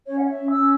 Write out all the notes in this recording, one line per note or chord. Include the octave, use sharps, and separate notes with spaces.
C#4 C#5
F#5
C#5 E5
C#4
E6
C#4